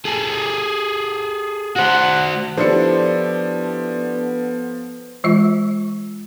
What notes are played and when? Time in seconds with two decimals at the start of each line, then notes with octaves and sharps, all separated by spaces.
0.05 G#4 A4
1.76 F#4 C5 F#5
2.57 F3 B3 D4 E4 G4 A4 C5 C#7
5.24 E3 G#3 F4 E5